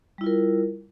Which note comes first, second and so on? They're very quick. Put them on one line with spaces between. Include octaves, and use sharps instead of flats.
G3 E4 F4 A#4